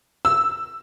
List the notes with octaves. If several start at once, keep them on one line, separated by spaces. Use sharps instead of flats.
E6